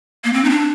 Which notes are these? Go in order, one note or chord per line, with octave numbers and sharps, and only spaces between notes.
A#3
C4
D#4
D4